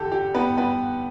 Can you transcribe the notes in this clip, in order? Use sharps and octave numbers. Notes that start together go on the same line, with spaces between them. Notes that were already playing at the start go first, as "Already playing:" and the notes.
Already playing: E2 D3 G4 A4
G4
B3 B4
B3 B4